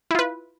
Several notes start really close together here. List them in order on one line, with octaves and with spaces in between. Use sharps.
E4 F4 B4